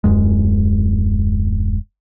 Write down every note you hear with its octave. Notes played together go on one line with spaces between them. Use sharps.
D#1 F#2 G#3